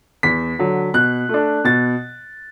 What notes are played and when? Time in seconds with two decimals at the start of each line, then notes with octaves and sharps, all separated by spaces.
0.23 E2 B6
0.59 D3 F#3
0.94 B2 F#6
1.29 A3 D4
1.64 B2 A6